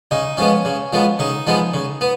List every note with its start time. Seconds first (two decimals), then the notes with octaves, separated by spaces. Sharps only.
0.11 C#3 D#4
0.37 F3 G#3 B3 C#4
0.65 C#3
0.93 F3 G#3 B3
1.19 C#3 D#4
1.47 F3 G#3 B3
1.74 C#3
2.01 B3